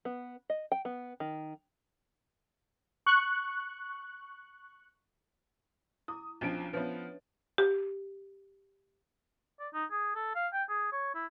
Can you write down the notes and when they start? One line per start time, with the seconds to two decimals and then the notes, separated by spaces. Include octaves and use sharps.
0.05 B3
0.50 D#5
0.72 G5
0.85 B3
1.20 D#3
3.06 C#6 F#6
6.08 E4 D6 D#6
6.41 B1 F3 C#4 D4 D#5 D7
6.73 F3 B3 B4 C#5 E5
7.58 G4
9.60 D5
9.74 D#4
9.91 G#4
10.16 A4
10.35 F5
10.53 G5
10.70 G#4
10.93 C#5
11.15 E4